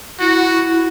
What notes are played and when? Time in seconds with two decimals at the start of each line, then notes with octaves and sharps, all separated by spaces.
0.20 E4 F#4